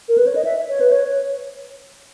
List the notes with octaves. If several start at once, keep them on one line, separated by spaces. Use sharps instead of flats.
A#4
B4
C#5
D#5
E5
C#5
B4
C#5
C#5